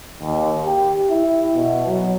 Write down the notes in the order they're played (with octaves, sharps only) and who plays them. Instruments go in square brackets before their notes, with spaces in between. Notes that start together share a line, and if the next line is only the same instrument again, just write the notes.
[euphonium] D#2
G4
E4
B2
F#3